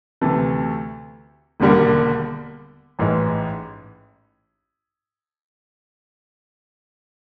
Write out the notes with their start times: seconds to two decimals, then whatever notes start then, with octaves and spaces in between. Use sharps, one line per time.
0.21 D2 C3 E3 A3
1.60 E1 D#2 D3 G3 A#3
2.99 A1 G#2 E3 G#3